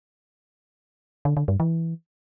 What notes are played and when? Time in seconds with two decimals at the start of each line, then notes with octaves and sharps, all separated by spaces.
1.25 D3
1.37 D3
1.48 G2
1.60 E3